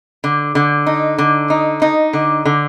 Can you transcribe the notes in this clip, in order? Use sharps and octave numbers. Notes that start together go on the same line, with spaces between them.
D3
D3
D#4
D3
D#4
D#4
D3
D3